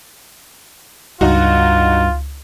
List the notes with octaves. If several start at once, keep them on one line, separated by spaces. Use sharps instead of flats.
C#2 G2 D#4 F4 F#4